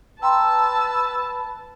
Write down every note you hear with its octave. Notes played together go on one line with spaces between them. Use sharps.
B4 G5 A5 A#5 C6 E6